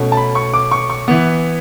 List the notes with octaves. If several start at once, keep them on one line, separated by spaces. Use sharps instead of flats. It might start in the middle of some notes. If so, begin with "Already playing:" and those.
Already playing: B2 A3 C#4
A5
B5
C#6
D6
C#6
C#6
E3 B3